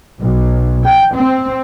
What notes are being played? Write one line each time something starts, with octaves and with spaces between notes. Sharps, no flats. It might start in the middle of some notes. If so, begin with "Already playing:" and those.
B1
G5
C4